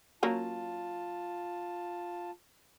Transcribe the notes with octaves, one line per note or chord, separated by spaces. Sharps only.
F#3 A#3 C#4 F4 A5